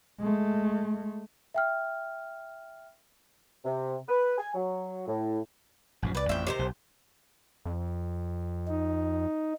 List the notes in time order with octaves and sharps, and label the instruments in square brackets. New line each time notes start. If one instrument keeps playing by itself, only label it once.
[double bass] G#3 A3
[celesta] E5 G5 F6
[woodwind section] C3
B4
G#5
F#3
A2
[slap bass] A1 F#2 F3
[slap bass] C2 [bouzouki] B4 D5
[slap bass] A1 F2 F3 [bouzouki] E5 G5
[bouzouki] C3 D#3 C5
[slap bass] B1
[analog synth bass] F2
[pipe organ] D#4